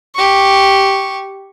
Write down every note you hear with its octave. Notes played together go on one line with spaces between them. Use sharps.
G4 C#6